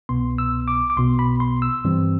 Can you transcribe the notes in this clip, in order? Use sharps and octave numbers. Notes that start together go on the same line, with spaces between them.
C2 B2 B3 C6
E6
D6
D6
B1 B2 B3 C6
B5
C6
E6
G2 E3 G3 C4